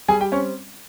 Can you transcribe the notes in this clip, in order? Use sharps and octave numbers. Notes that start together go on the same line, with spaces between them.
G3 G#4 G#5
G4 G5
C4 C#4 C#5